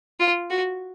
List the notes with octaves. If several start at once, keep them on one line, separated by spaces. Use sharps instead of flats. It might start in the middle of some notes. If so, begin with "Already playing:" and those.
F4
F#4